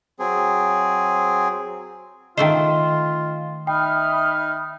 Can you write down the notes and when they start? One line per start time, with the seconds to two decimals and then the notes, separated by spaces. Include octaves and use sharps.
0.19 F#3 C4 G#4
2.37 D#3 A3 F4 C5 D#5 G5
3.67 D#4 E5 G5 B5 F6